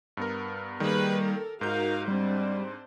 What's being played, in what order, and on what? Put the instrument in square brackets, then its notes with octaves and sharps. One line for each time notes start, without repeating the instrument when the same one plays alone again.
[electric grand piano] G2 B3 A#4
[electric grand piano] D#3 A#3 [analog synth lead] G3 [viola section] G#4 B4
[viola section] A4 A#4
[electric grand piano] G#2 G6 [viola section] D#4 F#4 F5 [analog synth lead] A#4
[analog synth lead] G3 [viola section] C4 D4 C5